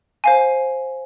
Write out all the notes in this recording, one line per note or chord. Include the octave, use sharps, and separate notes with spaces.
C5 F5 G#5